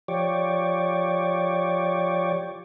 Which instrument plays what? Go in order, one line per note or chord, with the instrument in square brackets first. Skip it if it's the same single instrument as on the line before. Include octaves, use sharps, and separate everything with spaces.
[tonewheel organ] F3 G4 C#5 D5